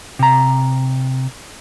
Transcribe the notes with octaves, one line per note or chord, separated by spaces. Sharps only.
C3 A#5